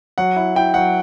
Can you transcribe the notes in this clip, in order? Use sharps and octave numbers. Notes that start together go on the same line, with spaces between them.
F#3 F#5
E4
E4 G5
F#3 F#5